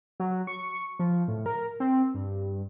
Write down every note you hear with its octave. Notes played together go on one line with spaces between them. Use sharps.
F#3
C#6
F3
A2
A#4
C4
G2